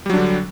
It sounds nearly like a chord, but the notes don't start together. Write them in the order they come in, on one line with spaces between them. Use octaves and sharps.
G3 F#3 D4 D3